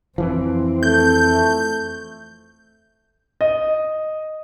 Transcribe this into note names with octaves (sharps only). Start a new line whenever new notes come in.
F2 E3 F3 C4
A3 G6
D#5